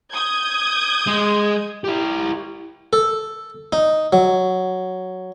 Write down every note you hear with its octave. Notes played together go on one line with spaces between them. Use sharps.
D#6 G6 G#6
G#3
E4 G4
A4
D#4
F#3